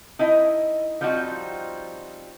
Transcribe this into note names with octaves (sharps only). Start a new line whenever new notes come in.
D#4 E4 D#5
F3 G3 C4 D#4 F#4